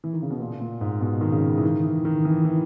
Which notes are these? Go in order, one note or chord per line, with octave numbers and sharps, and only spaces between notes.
E3
D#3
C#3
B2
A#2
A#2
G#2
B2
D#3
C#3
E3
D#3
E3
D#3
E3
E3